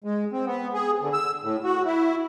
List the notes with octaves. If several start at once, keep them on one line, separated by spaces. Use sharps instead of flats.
G#3
C4
B3
G#4
D3
E6
A2
F#4
E4